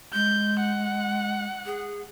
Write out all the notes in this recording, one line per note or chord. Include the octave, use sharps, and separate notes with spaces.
G#3 G6
F#5
G#4